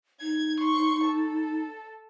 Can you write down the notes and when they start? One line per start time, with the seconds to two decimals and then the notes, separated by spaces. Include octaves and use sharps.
0.21 D#4 G#6
0.59 C6 C#6
1.05 A4